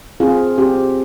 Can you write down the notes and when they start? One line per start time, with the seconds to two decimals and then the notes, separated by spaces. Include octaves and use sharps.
0.20 C4 F4 G#4
0.58 C4 G4